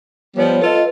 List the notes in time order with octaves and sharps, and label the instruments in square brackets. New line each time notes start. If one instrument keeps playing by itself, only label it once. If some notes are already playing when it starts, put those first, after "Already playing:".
[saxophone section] F3 G3 B3 [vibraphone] C#5
[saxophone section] F4 A4 [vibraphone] B4 D#5